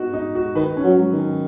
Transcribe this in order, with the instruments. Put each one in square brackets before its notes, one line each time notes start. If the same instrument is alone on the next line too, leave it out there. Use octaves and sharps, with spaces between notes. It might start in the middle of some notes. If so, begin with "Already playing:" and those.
Already playing: [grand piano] B3 D#4 F#4
D#4
F#4
[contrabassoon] D#3 [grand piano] B4
[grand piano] C#4
[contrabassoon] F#3
[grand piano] F#3
[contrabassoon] D#3
[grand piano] C#4